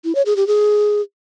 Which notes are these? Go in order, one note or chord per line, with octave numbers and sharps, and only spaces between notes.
E4
C#5
G#4
G4
G#4